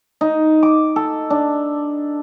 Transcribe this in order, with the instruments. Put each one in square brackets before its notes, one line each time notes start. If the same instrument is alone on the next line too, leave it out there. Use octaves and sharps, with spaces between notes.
[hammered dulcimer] D#4
D6
A4
D4